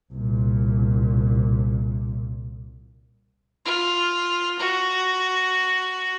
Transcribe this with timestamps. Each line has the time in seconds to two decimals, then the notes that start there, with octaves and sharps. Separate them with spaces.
0.12 C2 A#2
3.65 F4
4.59 F#4